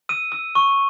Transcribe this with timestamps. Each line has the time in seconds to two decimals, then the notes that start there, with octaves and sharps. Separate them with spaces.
0.09 E6 D#7
0.32 E6
0.55 C#6